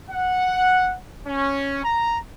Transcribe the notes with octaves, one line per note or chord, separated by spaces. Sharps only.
F#5
C#4
A#5